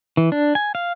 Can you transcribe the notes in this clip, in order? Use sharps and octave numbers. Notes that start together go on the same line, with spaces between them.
E3
D4
G#5
F5